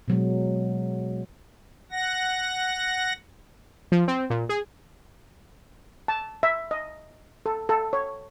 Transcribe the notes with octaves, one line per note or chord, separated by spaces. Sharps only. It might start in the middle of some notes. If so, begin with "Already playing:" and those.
B2 F#3 G#3
F#5 A#6
F3
C4
A#2
G#4
A5
E5
D#5
A4
A4
C#5